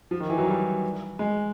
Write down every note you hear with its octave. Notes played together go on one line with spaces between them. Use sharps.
F3
D#3
E3
F#3
G3
G#3